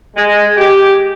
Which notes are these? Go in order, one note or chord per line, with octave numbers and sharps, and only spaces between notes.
G#3
G4